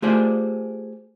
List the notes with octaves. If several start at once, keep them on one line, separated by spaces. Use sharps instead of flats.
A3 F4 G4 G#4 C5 D5